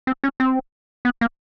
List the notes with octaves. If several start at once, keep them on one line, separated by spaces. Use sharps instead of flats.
C4
C#4
C4
B3
A#3